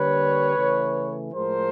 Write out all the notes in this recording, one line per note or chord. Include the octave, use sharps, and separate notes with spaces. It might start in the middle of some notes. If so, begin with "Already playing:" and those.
Already playing: D3 G3 A#3 B4 C#5
C#3 E3 A3
A2 F3 G#3 A#4 C5